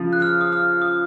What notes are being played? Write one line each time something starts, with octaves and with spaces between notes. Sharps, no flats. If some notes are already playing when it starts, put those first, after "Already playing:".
Already playing: C#3 F3
F#6
F6
D#6
F6
D#6